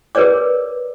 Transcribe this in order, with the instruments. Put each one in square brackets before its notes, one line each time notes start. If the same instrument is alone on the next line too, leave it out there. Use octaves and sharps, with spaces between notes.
[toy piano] G#4 A#4 B4 C#5 D5 D6